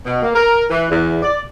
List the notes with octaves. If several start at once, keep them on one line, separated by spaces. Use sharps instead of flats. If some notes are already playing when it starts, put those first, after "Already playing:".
B2
A#3
A#4
E3
E2
D5